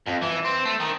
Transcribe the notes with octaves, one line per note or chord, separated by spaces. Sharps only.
F2
E3
C4
A3
D#3